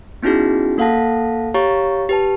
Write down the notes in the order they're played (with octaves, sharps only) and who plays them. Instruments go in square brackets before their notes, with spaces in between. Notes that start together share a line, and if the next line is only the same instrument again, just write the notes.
[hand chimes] B3 C#4 D#4 E4 F#4 G#4
A#3 A4 F5 F#5 A5 A#6
G4 C#5 F5 A#5 C#6 A6
G4 B4 A5